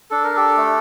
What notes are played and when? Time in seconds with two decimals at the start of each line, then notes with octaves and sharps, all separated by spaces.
0.11 D4 A4
0.24 A#4
0.36 G4 A4
0.57 A3